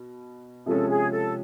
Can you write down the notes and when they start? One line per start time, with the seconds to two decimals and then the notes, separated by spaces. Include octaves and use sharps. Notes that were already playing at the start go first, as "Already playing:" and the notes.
Already playing: B2
0.66 C3 F3 G#3 C#4 A4
0.89 G#4
1.11 A4